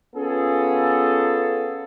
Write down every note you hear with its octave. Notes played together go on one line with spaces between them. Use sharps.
B3 C#4 F4 G#4 A4